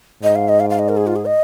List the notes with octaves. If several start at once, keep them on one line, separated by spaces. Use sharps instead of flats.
G#2 D#5
F5
D#5
F5
F5
D#5
A#4
G#4
F4
G#4
D#5